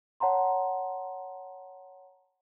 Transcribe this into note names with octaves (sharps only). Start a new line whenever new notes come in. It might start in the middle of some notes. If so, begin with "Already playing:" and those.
C#5 F#5 A5 A#5 C6